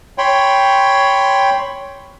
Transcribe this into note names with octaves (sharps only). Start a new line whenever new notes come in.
C#5 G5 B5 C6